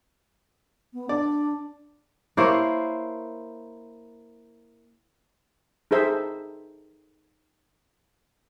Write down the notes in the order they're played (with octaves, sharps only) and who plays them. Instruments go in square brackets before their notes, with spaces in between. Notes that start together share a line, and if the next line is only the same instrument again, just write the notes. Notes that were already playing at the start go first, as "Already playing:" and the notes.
[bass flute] B3
[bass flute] D4 [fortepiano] D5
[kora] A#3 E4 C5 C#5
[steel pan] D#4 G#4 A4 C5 E5